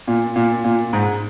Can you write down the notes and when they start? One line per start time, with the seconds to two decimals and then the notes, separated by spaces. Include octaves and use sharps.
0.08 A#2
0.36 A#2
0.64 A#2
0.93 G#2